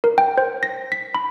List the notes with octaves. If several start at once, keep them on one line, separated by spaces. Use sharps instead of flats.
A#4
G5
C5
A#6
B6
B5